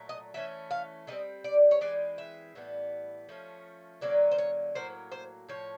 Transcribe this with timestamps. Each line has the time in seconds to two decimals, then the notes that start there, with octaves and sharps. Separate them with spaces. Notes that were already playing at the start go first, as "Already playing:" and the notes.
Already playing: A#2 F#3 A3
0.09 D#5
0.34 E3 A3 C#4 E5
0.71 F5
1.07 D3 G3 C4 D#5
1.44 D5
1.71 C#5
1.81 E3 G#3 C4 D5
2.18 E5
2.55 A2 E3 G3 B3
3.29 F3 A3 C#4
4.01 D3 F#3 A#3 C#4 D5
4.31 C5
4.38 C#5
4.75 A2 F#3 A#3 C5
5.12 C5
5.49 A2 F3 C#5